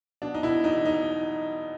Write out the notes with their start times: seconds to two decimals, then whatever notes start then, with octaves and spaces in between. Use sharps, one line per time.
0.22 B2 D4
0.34 D#4
0.43 B2 E4
0.64 E2 D#4
0.85 D#4